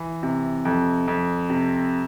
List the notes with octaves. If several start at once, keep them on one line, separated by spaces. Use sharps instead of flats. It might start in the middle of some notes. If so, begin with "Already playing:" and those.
Already playing: E3
C3
F2
F2
C3